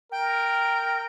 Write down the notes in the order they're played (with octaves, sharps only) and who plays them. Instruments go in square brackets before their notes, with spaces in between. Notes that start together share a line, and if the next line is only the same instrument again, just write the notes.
[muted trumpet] A#4 [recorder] G5